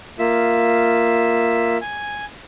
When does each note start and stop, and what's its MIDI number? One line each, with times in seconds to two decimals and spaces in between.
0.19 1.78 58
0.19 1.78 65
0.19 1.78 76
1.81 2.25 80